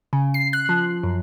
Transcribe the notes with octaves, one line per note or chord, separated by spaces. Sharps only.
C#3
C7
F#6
F3
F#2